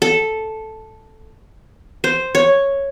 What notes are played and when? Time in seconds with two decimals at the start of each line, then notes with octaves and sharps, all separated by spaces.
0.02 A4
2.04 C5
2.35 C#5